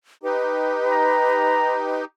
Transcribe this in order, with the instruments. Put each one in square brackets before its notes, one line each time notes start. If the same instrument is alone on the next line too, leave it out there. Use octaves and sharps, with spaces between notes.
[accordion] D#4 G4 [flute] B4
[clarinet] A#5